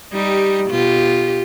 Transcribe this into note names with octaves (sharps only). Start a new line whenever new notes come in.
G3 D#4 G4
B2 F4 G4